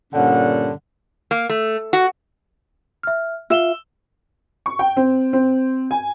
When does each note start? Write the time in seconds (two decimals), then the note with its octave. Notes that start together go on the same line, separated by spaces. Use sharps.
0.14 G2 A#2 D3 C#4 F#5
1.31 A#3
1.49 A3
1.93 F#4
3.03 E5 F6
3.50 F4 E5 E6 E7 G7
4.66 C#6
4.79 G5
4.97 C4
5.33 C4
5.91 G#5